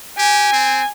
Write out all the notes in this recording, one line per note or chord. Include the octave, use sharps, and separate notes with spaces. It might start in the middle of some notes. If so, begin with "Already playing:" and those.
G4 G#5
C4